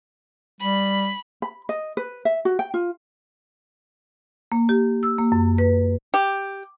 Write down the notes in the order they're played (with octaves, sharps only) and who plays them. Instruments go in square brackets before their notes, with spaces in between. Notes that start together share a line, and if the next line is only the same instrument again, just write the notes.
[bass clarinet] G3 [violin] B5
[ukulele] B5
D#5
B4
E5
F#4
G5
F4
[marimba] A#3
G4
E6
A#3
F#2
B4
[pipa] G4